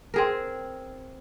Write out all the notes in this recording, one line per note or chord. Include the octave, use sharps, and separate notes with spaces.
C4 G#4 A#4